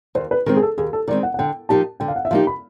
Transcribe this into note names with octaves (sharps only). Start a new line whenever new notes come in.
D#2 C5
B4
D#3 G#3 C4 A#4
G#4
A4
D#2 G#4
A4
D#3 G#3 C4 D5
F#5
F#5
D3 G5
F3 A#3 D#4 G4 A5
D3 G5
F5
F#5
E5
F3 A#3 D#4 G4 F5
B5